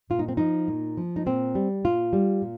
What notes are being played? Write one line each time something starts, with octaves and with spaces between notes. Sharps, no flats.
A#2 F4
D#4
C4
F3 D#4
A#2
F3
D#4
A#2 C4
G3
A#2 F4
G3
A#2